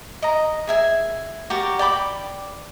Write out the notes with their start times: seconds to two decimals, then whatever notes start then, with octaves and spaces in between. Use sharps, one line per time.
0.22 D#5 A#5
0.67 G#4 E5 G#5
1.50 F#4 G4 A#4 D5
1.79 D5 G5 B5 D6